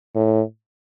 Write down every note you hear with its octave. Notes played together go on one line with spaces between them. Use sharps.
A2